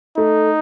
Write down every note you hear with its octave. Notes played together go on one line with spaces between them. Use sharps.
A3 D#4